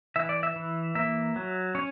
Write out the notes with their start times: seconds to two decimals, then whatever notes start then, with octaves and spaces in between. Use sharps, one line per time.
0.16 E3 E5
0.29 D5
0.43 E5
0.56 E3
0.95 A#3 E5
1.36 F#3
1.75 C#4 C#5